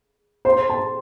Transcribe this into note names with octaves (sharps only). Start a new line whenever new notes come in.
C5 C6
A5